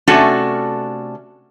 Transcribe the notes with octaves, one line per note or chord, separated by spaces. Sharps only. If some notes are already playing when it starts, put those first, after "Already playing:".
C3 A3 C#4 D4 F#4 A4